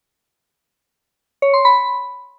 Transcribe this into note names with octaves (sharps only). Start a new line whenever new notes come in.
C#5
C6
B5